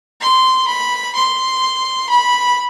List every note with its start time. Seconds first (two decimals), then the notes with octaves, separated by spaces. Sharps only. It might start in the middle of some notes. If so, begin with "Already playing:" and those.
0.21 C6
0.68 B5
1.15 C6
2.10 B5